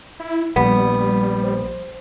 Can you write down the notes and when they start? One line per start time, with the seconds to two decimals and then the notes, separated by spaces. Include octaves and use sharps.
0.20 E4
0.56 A#1 G3 B3
1.44 C5